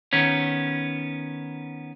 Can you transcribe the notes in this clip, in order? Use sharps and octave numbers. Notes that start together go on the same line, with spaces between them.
D#3 B3 C#4